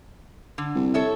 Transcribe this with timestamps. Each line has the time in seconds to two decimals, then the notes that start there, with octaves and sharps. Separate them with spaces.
0.58 D3
0.75 C2
0.94 A4 C#5 E5